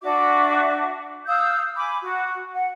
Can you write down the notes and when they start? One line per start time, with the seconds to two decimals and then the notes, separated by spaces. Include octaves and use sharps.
0.02 D4 F#4 E5 D6
1.26 F5 D#6 E6 G6
1.76 G#5 B5 D6
2.00 F#4
2.53 F#5